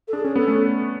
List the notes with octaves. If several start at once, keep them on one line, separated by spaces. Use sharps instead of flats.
A4
D4 G#4
C#4 G#4
B3 A4
A3 C#4